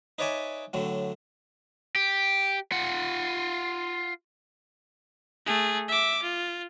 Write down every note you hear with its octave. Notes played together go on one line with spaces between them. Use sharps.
D#4 B4 C#5 D5 E5 G#5
A2 D3 F#3 A3
G4
F4 F#5
A3 G#4
E5 D6
F4